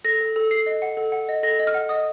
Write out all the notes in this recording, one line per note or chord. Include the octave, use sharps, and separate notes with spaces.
A4 A#6
A4
A4
A4 C7
D#5
F#5
A4
F#5
D#5
A4 A#6
D#5
F6
F#5
D#5 D#6